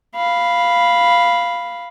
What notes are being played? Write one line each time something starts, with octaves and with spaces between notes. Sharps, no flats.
F5 B5